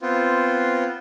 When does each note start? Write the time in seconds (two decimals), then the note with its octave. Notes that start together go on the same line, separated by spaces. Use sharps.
0.02 B3 C4 F4